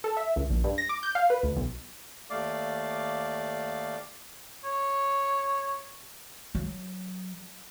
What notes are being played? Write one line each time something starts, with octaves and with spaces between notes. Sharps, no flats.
A4
E5
C#2
A#1
G2
A#6
D6
G6
F5
B4
D2
B1
D#2 A3 D5 F5 D6
C#5
F#3